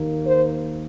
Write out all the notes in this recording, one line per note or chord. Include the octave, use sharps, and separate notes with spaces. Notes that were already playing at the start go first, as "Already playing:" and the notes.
Already playing: D#2 D#3 A#3
C5